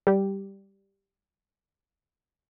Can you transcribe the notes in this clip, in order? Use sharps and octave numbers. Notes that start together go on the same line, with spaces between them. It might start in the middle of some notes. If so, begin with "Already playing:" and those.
G3 G4